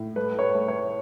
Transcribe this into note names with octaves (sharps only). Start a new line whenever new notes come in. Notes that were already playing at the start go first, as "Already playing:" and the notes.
Already playing: A2
A3 B4
C#5
B4
A3
C#5